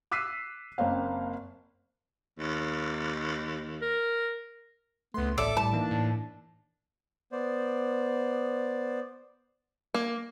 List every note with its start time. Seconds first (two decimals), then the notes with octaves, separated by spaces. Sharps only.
0.11 D6 E6 F#6 B6 C7 D#7
0.78 F#1 A#3 C4 F5
2.39 D#2
3.82 A#4
5.14 C#2 A3 B3 C6
5.38 A1 A4 D5 E5 D6
5.57 A2 G3 E4 A5
5.73 E3 A#3 D4 D#4
5.91 A2
7.32 B3 C5 D5
9.94 A#3